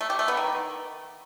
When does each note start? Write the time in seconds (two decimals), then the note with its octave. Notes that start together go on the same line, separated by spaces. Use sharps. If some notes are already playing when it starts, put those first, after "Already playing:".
0.01 A3
0.10 G4
0.19 A3
0.28 B3
0.37 D#3